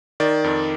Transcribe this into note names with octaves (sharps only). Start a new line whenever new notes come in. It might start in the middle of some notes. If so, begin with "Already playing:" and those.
D#3 D5
F2